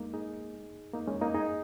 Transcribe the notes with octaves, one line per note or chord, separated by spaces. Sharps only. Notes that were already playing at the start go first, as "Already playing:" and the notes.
Already playing: G#3 A#3 D#4
D#4 G#4
A#3 D#4
G#3 C#4
A#3 D#4
D#4 G#4